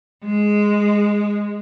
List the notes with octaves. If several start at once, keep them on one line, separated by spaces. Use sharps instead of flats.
G#3